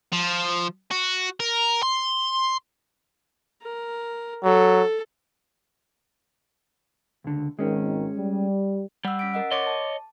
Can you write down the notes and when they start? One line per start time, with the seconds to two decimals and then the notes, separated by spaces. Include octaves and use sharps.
0.13 F3
0.91 F#4
1.40 A#4
1.83 C6
3.62 A#4
4.44 F#3 A4
7.24 C#2 D3
7.59 G#1 D#3 G#3 C#4
8.18 G3
9.05 G3 F#5 E6
9.19 C#4 B6 D7
9.34 A#4 D#5 F#5
9.51 C#5 D#5 C6 D6 A6
9.67 A5